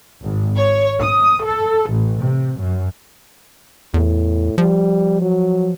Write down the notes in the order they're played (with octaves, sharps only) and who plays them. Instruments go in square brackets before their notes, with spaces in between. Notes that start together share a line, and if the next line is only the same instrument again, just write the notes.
[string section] G#1
C#5
D#6
A4
A1
C3
F#2
[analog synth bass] E2 [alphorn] A2
[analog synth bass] F3 [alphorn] G3
[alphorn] F#3